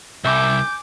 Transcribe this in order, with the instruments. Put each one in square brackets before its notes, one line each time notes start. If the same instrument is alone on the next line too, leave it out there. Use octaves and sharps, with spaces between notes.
[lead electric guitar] C2 [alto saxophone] E5 [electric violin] G#5 D6 [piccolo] G6